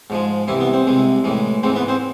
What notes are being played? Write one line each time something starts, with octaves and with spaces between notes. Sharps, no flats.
G#2 F3 G#3
C2 C3 E3 E4
B3
C4
C2 C3 G#3
A2 E3 G#3
G#2 E3 G#3 C4
B3 B4
C4 C5